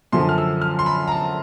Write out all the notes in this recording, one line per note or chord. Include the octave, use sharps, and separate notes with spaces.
F#2 D3 F3 C6
F6
E6
F6
C6
B5
A#5
A5